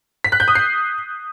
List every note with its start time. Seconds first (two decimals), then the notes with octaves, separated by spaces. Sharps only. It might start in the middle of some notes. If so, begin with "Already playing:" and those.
0.24 B6
0.32 F#6
0.40 G6
0.48 D#6
0.55 C7